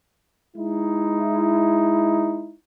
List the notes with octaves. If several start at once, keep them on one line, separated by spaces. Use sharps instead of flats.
G#3 D#4 E4